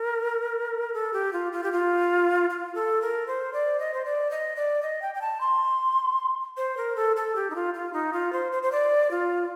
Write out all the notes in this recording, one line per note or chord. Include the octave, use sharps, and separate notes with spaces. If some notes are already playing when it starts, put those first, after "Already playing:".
Already playing: A#4
A4
G4
F4
F4
G4
F4
F4
A4
A#4
C5
D5
D#5
C5
D5
D#5
D5
D#5
G5
G5
A5
C6
C5
A#4
A4
A4
G4
D#4
F4
F4
D#4
F4
C5
C5
C5
D5
F4